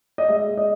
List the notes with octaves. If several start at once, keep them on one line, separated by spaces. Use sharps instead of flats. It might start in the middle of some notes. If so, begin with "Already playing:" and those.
D#5
G#3 E5
G#3
D#5